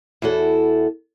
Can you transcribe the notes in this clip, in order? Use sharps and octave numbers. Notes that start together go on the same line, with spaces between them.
E2 E4 F#4 A4